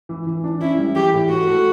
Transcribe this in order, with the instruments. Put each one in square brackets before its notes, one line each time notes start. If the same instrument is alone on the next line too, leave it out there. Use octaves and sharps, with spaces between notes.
[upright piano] E3
E3
D4
[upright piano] C#4 [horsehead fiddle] E4
[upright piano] G3
[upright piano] E3 [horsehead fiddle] G4
[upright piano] A2
[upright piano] A2 [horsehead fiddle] F#4
[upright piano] A3